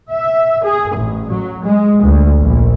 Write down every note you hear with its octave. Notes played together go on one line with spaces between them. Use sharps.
E5
G#4
A1
F#3
G#3
D2
A#1